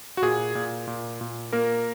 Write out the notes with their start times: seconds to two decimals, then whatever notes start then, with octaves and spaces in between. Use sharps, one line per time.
0.17 F#4
0.22 A#2 G#4
0.55 A#2
0.88 A#2
1.21 A#2
1.53 A#2 A#3 A#4